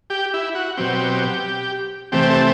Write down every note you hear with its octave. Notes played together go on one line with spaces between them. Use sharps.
G4
E4
F#4
B2 F#3 C4 G4
C3 E3 A3 C4 G4
A4